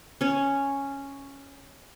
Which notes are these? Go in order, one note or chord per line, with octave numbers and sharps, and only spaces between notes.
C#4 C#5